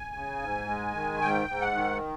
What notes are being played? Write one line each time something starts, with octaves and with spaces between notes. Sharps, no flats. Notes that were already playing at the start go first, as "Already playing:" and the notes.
Already playing: G#5
C#3
G#2
G#3
D#3
G#2 G5
G#2
F#5
D#3